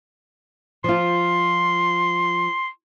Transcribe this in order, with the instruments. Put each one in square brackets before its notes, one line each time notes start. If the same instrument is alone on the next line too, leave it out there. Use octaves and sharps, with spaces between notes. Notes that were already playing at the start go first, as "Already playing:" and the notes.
[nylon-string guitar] F3 F4 [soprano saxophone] C6